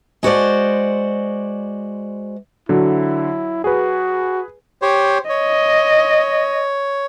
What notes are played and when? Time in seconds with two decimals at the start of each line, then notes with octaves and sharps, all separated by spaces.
0.23 G#3 F#4 C5 D5
2.69 D3 F#3 E4
3.64 F#4 G#4 B4
4.82 G4 C5 C#5
5.29 C#5 D#5